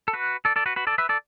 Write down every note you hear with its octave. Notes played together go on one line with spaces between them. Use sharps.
A4
F#4 B4
A4 D5
A4 D5
F#4 B4
F#4 B4
A4 D5
B4 E5
A4 D5